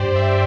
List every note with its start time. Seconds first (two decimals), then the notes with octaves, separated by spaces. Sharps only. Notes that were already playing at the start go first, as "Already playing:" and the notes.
Already playing: G2 G4 C5 D5
0.16 E5